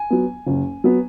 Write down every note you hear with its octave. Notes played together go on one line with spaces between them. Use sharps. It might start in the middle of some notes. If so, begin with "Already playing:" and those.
Already playing: G#5
F#3 B3
F#1
F#3 B3